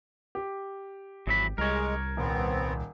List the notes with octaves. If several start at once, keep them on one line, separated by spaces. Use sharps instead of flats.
G4
G#1 E3 F#3 B5
C2 G#3 A#4 C#5
D#1 B3 C4